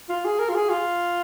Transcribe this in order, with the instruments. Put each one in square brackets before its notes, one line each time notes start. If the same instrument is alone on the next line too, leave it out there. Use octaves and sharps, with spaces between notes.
[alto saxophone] F4
G#4
A#4
F4
G#4
F4